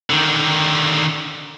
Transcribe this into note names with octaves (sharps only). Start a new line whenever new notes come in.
D3 D#3